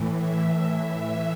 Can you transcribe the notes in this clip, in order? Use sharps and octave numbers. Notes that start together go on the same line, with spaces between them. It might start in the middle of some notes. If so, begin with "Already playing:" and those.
Already playing: A2 E3
E5
A2 E3